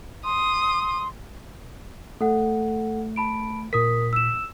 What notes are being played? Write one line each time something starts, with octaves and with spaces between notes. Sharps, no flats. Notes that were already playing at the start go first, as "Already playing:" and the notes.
C6 D#6
A3 A4 F#5
A5 B5 D7
A#2 A#4 D#6 B6
E6 E7